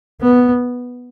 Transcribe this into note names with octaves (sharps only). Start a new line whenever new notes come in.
B3